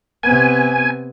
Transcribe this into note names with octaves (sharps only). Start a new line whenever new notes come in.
C3 B3 G#5